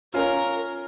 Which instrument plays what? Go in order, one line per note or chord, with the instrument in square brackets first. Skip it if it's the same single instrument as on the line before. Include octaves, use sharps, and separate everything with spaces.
[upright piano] C#4 F4 [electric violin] A#4